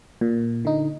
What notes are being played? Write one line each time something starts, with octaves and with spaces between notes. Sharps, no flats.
A#2
D3 D#4